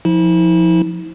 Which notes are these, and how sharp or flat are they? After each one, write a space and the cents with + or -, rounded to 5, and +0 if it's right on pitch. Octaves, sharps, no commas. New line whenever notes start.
F3 +0 E4 -40